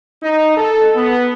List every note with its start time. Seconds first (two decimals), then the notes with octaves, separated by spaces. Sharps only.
0.23 D#4
0.56 A4
0.95 B3